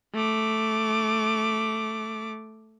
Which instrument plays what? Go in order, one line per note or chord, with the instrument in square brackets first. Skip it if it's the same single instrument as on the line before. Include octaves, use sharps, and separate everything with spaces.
[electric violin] A3 D6